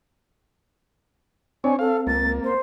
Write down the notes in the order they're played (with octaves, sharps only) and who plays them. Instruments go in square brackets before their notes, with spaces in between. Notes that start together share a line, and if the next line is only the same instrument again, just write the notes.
[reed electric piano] C4 [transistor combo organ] D4 C#5 [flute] G#5
[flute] A4 [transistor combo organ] F5
[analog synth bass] C#2 [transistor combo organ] A#3 [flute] A6
[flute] C5